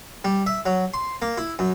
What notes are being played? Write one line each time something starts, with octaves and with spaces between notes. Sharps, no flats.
G3
E5
F#3
C6
A#3
E4
F#2